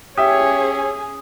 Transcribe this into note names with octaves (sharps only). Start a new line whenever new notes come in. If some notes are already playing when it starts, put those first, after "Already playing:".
C#4 G4 G#4 C#5 E5 D#6